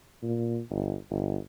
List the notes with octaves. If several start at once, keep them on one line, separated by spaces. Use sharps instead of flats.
A#2
G1
G1